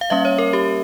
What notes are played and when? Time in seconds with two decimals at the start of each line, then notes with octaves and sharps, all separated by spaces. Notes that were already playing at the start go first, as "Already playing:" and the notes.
0.01 F5
0.10 G3 A#3 C#4 E5
0.25 C#5
0.38 A#4
0.53 G4